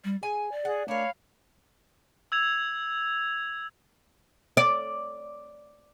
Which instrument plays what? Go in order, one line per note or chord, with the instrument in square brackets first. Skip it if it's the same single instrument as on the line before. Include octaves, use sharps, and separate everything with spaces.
[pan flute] G3
[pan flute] G#4 [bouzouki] G#5
[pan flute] D5
[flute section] G#4 [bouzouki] F#5
[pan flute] A3 [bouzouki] D4 A#4 [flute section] C#5 F5 B5
[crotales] E6 G#6 F7
[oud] D5